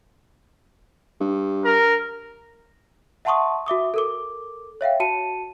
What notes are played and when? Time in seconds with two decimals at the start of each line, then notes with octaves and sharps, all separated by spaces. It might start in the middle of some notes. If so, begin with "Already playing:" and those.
1.20 G2
1.65 A#4
3.25 E5 F#5 A5 C6 C#6 D#6
3.66 F#4 E5 D6 D#6
3.94 A4 A#4 D6
4.81 C#5 E5 F5 G5
5.00 F#4 A5 C#7 D#7